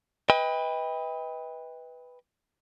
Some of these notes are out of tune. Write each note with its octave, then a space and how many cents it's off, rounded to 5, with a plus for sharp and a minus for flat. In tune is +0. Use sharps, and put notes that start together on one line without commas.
B4 +0 D#5 +35 G5 +30